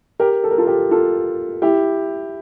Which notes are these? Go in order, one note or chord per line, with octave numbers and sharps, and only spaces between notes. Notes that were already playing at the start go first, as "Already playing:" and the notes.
G4 A#4
A4
A#4
F4 A4
G4 A#4
F4 A4
E4 G4